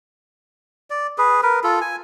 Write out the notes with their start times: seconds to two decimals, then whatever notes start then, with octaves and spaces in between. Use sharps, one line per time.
0.90 D5
1.18 G#4 B4
1.43 A#4 B4
1.64 F4 A4
1.81 G#5